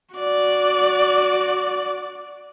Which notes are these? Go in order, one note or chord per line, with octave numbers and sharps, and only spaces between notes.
F#4 D5